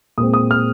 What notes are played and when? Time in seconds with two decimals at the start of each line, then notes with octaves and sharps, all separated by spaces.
0.18 A#2 G#3 C4 D#6
0.34 D#6
0.51 F6